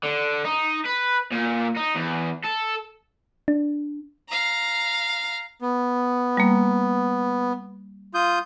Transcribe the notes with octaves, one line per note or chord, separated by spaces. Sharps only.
D3
D#4
B4
A#2
D#4
E2
A4
D4
F5 A#5
B3
G3 A#3
F4 D#6 G6